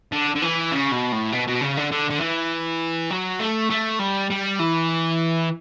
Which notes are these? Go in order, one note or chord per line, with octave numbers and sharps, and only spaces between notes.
D3
D3
E3
C#3
B2
A2
B2
B2
C#3
D3
D3
D3
E3
F#3
A3
A3
G3
G3
E3